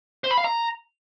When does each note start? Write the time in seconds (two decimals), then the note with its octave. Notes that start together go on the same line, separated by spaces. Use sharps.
0.24 C5
0.31 B5
0.38 F5
0.44 A#5